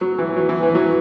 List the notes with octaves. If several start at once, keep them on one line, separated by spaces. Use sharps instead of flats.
F#3
E3
F#3
E3
E3
F#3